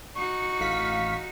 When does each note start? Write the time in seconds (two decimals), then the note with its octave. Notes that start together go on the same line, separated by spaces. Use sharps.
0.15 D#4 F#4 C#6
0.60 A1 F5 B6